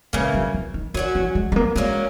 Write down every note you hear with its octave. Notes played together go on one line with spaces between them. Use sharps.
C#3 E3 G#3 A#3
F#3
E3
D#3
D#3 F#3 C#4 F#4
E3
G#3
G#3
A#3
F#3 G#3 A#3 C#4